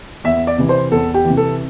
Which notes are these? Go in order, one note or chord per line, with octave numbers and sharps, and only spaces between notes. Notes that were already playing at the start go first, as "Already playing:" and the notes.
E2 E5
D5
C3 E3
C5
E2 A4
G4
C3 E3
A4